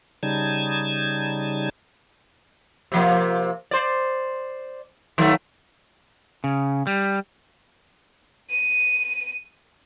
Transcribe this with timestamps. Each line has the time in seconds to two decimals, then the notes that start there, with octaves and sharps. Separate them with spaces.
0.23 C#3 G3 D#4 A5 G#6
2.92 C3 F3 A#3
3.71 C5 D5
5.18 D#3 F#3 A3
6.44 C#3
6.87 G3
8.50 D#7